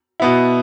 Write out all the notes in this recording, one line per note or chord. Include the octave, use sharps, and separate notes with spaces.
B2 B3 E4